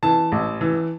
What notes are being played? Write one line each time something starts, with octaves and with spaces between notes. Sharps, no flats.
E3 A5
A1
E3